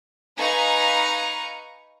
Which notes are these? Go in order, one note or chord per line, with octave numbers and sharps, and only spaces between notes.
D#4 B4 F5 G#5 A#5 C#6